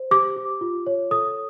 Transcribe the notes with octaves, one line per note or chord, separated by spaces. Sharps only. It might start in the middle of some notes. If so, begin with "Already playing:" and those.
Already playing: C5
G4 D6
G4
F4
C#5
A4 D#6